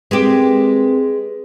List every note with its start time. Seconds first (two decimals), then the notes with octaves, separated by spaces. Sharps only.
0.11 G#3 C4 G4 A#4 B4